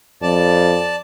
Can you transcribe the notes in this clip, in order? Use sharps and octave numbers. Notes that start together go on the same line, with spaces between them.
F2 D5 A5